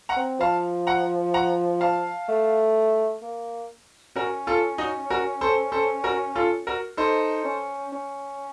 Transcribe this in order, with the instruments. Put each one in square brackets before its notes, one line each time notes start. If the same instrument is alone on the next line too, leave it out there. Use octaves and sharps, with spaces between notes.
[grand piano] F#5 A#5
[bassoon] C4
[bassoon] F3 [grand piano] F5 A5
[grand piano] F#5 A#5
F#5 A#5
F5 A5
[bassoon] A3
A#3
[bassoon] C#4 [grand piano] F#4 A#4
[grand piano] F4 A4
D#4 F#4
F#4 A#4
A4 C5
A4 C5
F#4 A#4
F4 A4
F#4 A#4
[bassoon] D#4 [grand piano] A4 C5
[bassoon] C#4
C#4